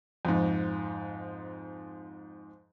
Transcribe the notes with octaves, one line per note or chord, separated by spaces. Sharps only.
F2 G#2